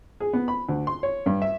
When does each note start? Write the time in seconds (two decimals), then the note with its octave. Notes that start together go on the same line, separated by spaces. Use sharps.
0.20 G#4
0.33 B3
0.48 B5
0.69 D2
0.87 C6
1.03 C#5
1.26 G2
1.42 E5